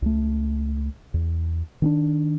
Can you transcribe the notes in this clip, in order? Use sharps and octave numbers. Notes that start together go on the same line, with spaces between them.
C#2 A3
E2
D#3 C4 D4